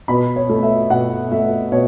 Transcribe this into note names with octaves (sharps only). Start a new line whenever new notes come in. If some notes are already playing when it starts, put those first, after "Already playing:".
B2 B5
C#5
A3
E5
B2 F#5
A3 E5
B2 C#5